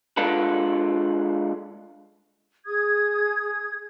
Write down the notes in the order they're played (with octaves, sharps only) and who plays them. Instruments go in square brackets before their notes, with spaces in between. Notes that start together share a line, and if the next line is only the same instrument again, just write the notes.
[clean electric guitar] G#3 D4 F4 A4 B4
[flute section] G#4 D#6 G#6